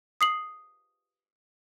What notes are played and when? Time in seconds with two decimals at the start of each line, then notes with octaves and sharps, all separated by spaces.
0.21 D#6 C7 F#7